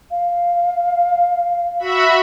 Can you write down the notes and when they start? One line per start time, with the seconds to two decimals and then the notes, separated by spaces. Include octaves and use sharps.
0.11 F5
1.79 F#4 E5 B5